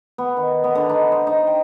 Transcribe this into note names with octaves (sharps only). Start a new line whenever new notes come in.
B3
D#3
B3
D3
D#4
C5
D#4
G5